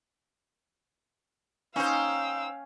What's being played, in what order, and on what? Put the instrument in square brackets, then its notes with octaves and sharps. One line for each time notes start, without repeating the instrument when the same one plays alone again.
[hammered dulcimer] C#4 [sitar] D#4 C5 [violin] F5 G5 [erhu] E6